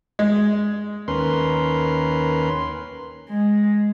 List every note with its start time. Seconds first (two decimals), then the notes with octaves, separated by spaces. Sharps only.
0.19 G#3
1.08 D#2 C#4 A#4 B4 C6
3.30 G#3